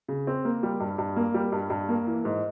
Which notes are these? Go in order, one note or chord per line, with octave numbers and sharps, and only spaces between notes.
C#3
C4
A#3
G3
G2
G2
A#3
G3
G2
G2
A#3
E3
G#2